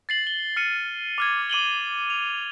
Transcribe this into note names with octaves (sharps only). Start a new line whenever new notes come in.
A6 C7 F#7
G7
F6 C#7 D#7
D6 F6 G#6
D6 D#7 F#7 G7
F7